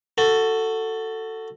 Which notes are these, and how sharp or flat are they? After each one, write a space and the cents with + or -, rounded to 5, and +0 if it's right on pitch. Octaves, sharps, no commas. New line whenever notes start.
F#4 +0 A4 +15